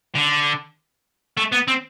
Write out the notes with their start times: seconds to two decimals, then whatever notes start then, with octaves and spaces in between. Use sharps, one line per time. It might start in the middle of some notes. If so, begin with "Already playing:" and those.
0.15 D3
1.37 A3
1.52 B3
1.68 C4